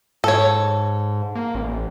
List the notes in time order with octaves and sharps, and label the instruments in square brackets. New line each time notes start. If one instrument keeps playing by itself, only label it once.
[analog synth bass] G#2 [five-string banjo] A4 C#5
[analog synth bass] A#3
A1